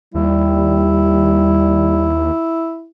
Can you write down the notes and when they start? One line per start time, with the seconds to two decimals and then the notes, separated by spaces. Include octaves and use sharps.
0.15 D#2 G3 E4